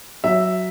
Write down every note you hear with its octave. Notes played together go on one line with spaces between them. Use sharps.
F#3 E5